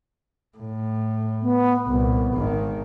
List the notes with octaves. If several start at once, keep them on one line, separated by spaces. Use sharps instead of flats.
A2
B3
C2 A#2 B3
G#1 D#3